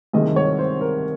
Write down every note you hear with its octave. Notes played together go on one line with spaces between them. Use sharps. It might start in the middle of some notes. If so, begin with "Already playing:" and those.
C2 C3 D#3 G#3 D#5
C#5
C5
A#4